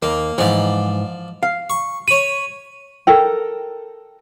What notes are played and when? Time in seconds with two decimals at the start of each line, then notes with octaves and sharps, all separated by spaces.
0.02 D#2 A#3
0.38 G#2 E3 F3 D5
1.43 F5
1.70 C#6
2.08 C#5 B5 D#7
3.07 A4 A#4 G5